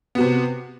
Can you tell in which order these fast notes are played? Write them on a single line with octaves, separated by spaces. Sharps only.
B3 F#4 C3